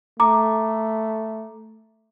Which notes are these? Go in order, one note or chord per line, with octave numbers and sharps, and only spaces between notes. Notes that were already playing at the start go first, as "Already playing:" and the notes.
A3 A#5 D6